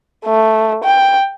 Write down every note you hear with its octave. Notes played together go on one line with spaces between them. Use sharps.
A3
G5